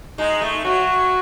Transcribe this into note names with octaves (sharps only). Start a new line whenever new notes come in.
G#3 D#4
A3
F#3 F#4